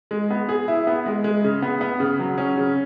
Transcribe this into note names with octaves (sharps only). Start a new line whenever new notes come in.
G#3
B3
G#4
E4
B3
G#3
G#3
C#3
B3
B3
C#3
F#3
C#4
C#3